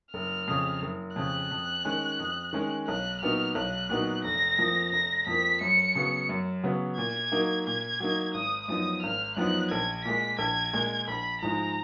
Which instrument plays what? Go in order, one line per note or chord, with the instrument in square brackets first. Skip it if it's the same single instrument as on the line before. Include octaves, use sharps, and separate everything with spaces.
[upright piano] F#1 [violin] F6
[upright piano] F2 C#3
F#1
[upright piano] F2 C#3 [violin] F#6
[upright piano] F2
D#3 G#3 C#4
F2
D#3 G#3 C#4
[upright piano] B1 [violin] F#6
[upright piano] A#2 F#3 B3 D#4 [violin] F6
[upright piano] B1 [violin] F#6
[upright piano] A#2 F#3 B3 D#4
[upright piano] F1 [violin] A#6
[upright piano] F2 F3 A#3
[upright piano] F1 [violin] A#6
[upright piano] F2 F3 A#3 [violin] B6
[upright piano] F#2 [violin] C#7
[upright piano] C#3 F#3 B3
F#2
C#3 F#3 B3
[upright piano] A#2 [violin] G#6
[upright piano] F#3 A#3 D#4
[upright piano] A#2 [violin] G#6
[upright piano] F#3 A#3 D#4
[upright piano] G#1 [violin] D#6
[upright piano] F#2 F3 B3 D#4 [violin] D#6
[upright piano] G#1 [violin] F6
[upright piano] F#2 F3 B3 D#4 [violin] F#6
[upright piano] A#1 [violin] G#6
[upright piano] A#2 G#3 [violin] B6
[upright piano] A#1 [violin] G#6
[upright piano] A#2 G#3
[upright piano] A#1 [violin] B5
[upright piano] G#2 F3 G#3 D#4 [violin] A#5